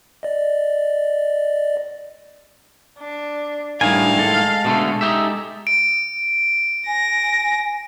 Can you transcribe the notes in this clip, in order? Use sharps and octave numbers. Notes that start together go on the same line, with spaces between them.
D5 D#5
D4
A2 D#3 G3 D4 F5 G#5
G#3 A4
B2 D3 A3
D#4 G4 E5
D7
G#5 A#6